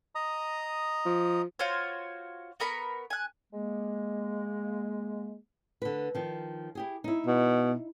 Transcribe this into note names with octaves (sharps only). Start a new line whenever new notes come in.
D#5 A#5 D#6
F3
F4 F#4 C5 C#5
B3 A#4 B5 C#6
G#5 F#6
G#3 A#3
D3 B4
D#3 F3
E4 G4 G#4
D#4 E4
B2